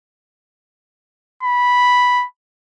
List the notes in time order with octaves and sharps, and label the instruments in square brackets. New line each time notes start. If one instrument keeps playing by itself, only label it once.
[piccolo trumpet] B5